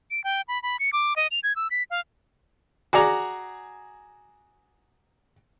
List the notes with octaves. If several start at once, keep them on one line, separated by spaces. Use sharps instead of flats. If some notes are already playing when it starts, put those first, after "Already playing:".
D7
G5
B5
B5
C#7
D6
D#5
F7
G#6
E6
B6
F5
F#4 G#4 D5 A#5